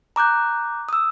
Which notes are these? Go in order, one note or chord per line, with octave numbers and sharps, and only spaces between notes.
A#5 D6 F#6 G6
D#6 E6